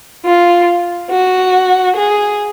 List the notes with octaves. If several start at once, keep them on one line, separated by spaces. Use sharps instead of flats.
F4
F#4
G#4